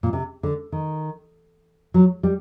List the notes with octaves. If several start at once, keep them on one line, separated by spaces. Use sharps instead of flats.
A#2
C3
D3
D#3
F#3
G3